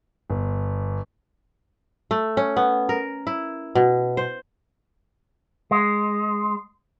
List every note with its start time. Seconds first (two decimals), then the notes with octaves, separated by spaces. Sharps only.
0.30 G1
2.11 A3
2.37 C#4
2.57 B3
2.89 A#4
3.27 E4
3.75 B2
4.17 C5
5.71 G#3